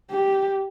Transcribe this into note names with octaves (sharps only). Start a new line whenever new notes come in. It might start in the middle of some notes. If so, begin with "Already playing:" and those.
G4